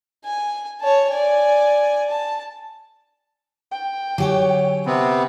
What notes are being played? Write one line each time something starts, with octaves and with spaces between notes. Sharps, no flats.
G#5
C#5 A5
D5 G#5
A5
G5
D3 F#3 G4 C#5 G#5
C3 B3 C4 B5